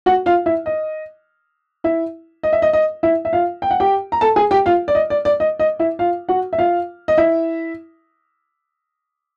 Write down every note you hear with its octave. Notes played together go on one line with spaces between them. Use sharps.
F#4 F#5
F4 F5
E4 E5
D#5
E4 E5
D#5
E5
D#5
D#5
E4 E5
E5
F4 F5
G5
F#5
G4 G5
A#5
A4 A5
G#4 G#5
G4 G5
F4 F5
D5
D#5
D5
D5
D#5
D#5
E4 E5
F4 F5
F#4 F#5
E5
F4 F5
D#5
E4 E5